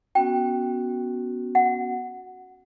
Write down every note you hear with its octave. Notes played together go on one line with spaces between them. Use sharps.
B3 C#4 F#4 G5
F#5